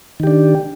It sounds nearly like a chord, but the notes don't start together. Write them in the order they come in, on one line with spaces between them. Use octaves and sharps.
D#3 G4 D4